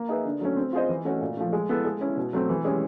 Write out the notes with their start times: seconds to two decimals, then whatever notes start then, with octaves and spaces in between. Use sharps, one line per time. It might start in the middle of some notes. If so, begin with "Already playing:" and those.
Already playing: A#3
0.09 D#4 G#4 B4 E5
0.25 D3
0.40 F#3 A3 C#4
0.57 C4
0.73 F4 G#4 C5 D#5
0.89 E3
1.05 A3 C#4 F#4
1.21 A#2
1.37 F3 A3
1.53 G#3
1.69 B3 E4 A4
1.85 G#3
2.01 C#4 E4
2.17 B2
2.33 F#3 A3 C4
2.49 E3
2.65 G#3 C#4 E4 G4